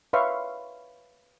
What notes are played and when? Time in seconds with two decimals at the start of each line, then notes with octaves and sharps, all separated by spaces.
0.13 B4 C#5 E5 F5 C6 C#6